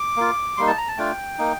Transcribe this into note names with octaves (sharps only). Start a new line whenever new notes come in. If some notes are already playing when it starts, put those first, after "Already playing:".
Already playing: D6
A#3 F4
G3 A#3 D#4 C6
A5
A#5
A5
A3 D4 F4 G5
A#3 D#4